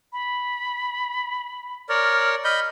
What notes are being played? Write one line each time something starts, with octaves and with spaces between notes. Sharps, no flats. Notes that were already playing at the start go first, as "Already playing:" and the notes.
B5
A#4 C#5 D5 F6
D#5 B5 F6 G6